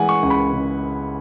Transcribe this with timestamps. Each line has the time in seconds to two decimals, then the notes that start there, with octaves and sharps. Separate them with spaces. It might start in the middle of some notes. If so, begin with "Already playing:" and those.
Already playing: E3 G#3 F#5 G#5
0.09 C#6
0.23 C#2
0.30 B5
0.52 C#3